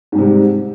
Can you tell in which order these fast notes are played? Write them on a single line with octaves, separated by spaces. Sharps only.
G#2 G3 C3 G#3